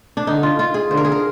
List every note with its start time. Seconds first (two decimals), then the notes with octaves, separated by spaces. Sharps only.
0.17 D4
0.27 D3 D#4
0.43 F4
0.59 F4
0.74 G#4
0.91 D3 C5
0.97 A#4
1.05 G#4
1.12 A#4